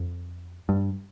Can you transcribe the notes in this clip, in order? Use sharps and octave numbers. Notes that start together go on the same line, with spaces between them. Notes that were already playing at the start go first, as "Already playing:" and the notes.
Already playing: F2
G2